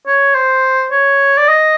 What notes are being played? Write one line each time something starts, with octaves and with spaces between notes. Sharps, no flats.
C#5
C5
C#5
D5
D#5